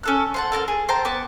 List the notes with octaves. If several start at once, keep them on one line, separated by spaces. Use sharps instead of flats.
C#4 A4 F#6
C5 F#5 A5
A4 A#4 A5 F6
G#4
C5 G5 A5 A#5
B3 A5 D6